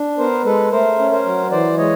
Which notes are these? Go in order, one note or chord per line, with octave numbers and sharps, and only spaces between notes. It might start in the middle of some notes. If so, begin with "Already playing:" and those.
Already playing: D4
B3 A#4 C5
G#3 A4 B4
A3 A#4 C5
C#4
A#4 C5
F#3
E3 C5 D5
G#3 C#5 D#5